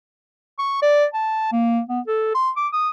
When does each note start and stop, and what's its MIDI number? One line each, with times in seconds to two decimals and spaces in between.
0.58 0.80 85
0.82 1.05 74
1.13 1.51 81
1.52 1.81 58
1.89 2.00 59
2.07 2.30 69
2.35 2.50 84
2.56 2.68 86
2.73 2.90 87